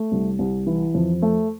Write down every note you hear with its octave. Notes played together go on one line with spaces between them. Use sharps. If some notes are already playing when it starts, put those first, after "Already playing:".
Already playing: A3
C2
C2
E3
F2
A3